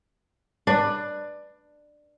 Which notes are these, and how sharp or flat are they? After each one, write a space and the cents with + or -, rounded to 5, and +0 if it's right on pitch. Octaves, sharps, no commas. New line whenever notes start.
D4 +15 B4 +0